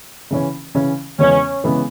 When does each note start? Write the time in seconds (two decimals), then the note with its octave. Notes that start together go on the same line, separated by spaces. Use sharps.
0.31 C#3 E3 C#4
0.75 C#3 E3 C#4
1.19 E2 C#3 E3 G#3 B3 C#4
1.64 C#3 E3 G#3 B3